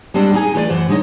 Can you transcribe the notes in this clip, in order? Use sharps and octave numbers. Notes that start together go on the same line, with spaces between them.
G3 G#3 C4 D4 A4 F#5
D#4 G#4 G#5
E3 A3 F4 B4 D5
F#2 E3 C5 F#5
D3 G#3 C#4 D#4 C#5